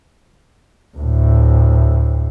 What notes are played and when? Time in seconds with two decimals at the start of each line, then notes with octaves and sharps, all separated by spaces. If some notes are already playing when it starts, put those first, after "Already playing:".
0.98 D2 A2